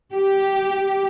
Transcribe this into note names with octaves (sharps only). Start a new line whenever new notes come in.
G4